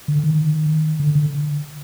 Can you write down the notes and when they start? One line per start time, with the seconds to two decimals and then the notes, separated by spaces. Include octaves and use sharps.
0.08 D3
0.23 D#3
1.00 D3
1.15 D3